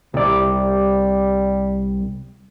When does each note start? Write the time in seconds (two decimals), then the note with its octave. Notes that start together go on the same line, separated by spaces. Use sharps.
0.14 C2 G3 D5